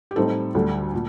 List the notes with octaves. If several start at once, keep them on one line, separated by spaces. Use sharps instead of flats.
G4
A2 G3 C4 D#4 A4
D2 D3 G3
A#2